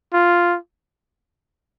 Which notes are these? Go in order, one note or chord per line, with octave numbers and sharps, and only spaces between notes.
F4